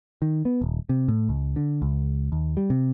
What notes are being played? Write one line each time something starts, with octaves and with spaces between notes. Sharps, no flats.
D#3
B3
D#1
C3
A2
C#2
D3
C#2
D#2
G3
C3